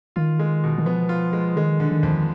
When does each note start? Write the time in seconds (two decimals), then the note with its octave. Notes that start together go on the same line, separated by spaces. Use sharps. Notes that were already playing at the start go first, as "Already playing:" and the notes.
0.16 D#3 F4
0.39 G#3
0.64 B2
0.78 D#3
0.86 F3 B3
1.09 F4
1.33 G#3
1.56 D#3 G#3
1.80 D3
1.91 D#3
2.03 F2